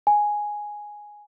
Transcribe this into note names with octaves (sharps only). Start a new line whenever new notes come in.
G#5